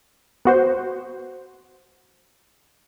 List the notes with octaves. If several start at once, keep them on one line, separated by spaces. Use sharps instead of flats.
B3 F#4 C5